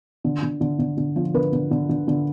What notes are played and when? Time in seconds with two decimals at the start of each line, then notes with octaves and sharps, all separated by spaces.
0.24 D3
0.43 D3
0.61 D3
0.79 D3
0.98 D3
1.16 F3
1.34 D3 B4
1.53 D3
1.71 D3
1.89 D3
2.08 D3